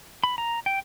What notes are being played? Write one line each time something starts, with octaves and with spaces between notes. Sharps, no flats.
B5
A#5
G5